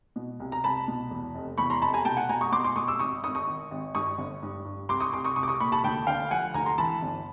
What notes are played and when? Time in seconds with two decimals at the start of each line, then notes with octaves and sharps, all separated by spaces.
0.16 B2
0.40 C2
0.52 A#5
0.64 C2 A5 B5
0.88 B2
1.11 E2
1.35 F1
1.58 E2 B5 C#6
1.70 A#5 C6
1.82 F1 A5 B5
1.94 G#5 A#5
2.05 B2 G5 A5
2.17 F#5 G#5
2.29 B2 G#5 A#5
2.41 C#6 D#6
2.52 B2 C6 D6
2.64 C6 D6
2.76 B2 C#6 D#6
2.88 D6 E6
2.99 G#1 C#6 D#6
3.23 G#1 C#6 D#6
3.35 C#6 D#6
3.47 D#3
3.71 G#1
3.95 G2 C#6 D#6
4.19 G1
4.43 G2
4.65 G2
4.89 C2 C6 D6
5.00 C#6 D#6
5.13 C2 C6 D6
5.25 C#6 D#6
5.36 C2 C#6 D#6
5.43 D6
5.48 C#6 D#6
5.60 A#2 B5 C#6
5.72 A5 B5
5.84 D2 G5 A5
6.07 D3 F5 G5
6.31 F3 F#5 G#5
6.54 D2 G#5 A#5
6.66 A#5 C6
6.78 E3 A5 B5
7.03 G1